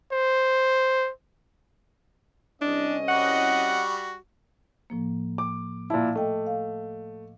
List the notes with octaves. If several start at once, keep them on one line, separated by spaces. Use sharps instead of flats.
C5
C2 C#4 D4 D#5
G3 F#4 F#5
A2 F3 A#3
D6
A#2 E4 A5
A3 D#5 G5
F5